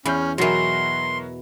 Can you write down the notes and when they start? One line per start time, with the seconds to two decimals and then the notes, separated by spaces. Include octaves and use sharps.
0.06 E2 C#4 B5 F6 G6
0.38 B2 E3 F#3 F#4 A#4 C6